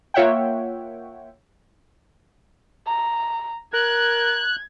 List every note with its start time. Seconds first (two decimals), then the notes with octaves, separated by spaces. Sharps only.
0.14 A#3 F4 C#5 E5 F#5 G5
2.87 A#5
3.74 A#4 F#6 G#6